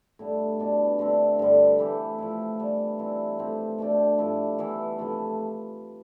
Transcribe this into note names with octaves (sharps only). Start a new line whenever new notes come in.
A2 G3 B3 D4
B2 B3 D4
D3 A3 C4
G2 D3 G3
E3 A3 E4 G4
F3 A3 E4
E3 G3 B3 D4
E3 G3 C4 E4
A2 F3 C4 G4
B2 A3 D4 G4
G2 F3 A3 E4
E3 B3 E4
C3 F3 A3